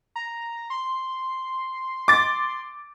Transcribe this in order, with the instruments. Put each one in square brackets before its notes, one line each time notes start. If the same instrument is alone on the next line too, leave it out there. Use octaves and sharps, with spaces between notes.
[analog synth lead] A#5
C6
[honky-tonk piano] D6 A6